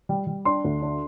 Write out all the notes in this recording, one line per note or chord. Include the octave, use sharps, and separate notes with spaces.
G3
G3
D4 C6
D2
D4